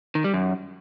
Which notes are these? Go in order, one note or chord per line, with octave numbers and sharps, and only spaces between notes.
D#3
G3
F#2